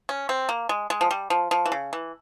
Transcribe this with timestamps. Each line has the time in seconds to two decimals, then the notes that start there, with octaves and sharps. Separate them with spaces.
0.09 C#4
0.29 C4
0.49 A#3
0.69 G#3
0.90 G#3
1.01 F3
1.11 G3
1.30 F3
1.51 F3
1.65 E3
1.72 C#3
1.93 E3